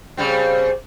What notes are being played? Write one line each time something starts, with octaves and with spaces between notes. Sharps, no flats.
C#3 G3 C4